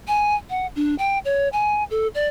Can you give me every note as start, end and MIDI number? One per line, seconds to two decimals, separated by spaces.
0.08 0.35 80
0.50 0.67 78
0.76 0.95 62
0.99 1.18 79
1.25 1.48 73
1.53 1.84 80
1.91 2.07 69
2.15 2.28 74